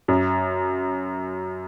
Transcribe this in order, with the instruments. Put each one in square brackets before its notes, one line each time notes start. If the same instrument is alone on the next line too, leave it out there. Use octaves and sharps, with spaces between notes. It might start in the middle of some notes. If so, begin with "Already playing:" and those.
[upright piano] F#2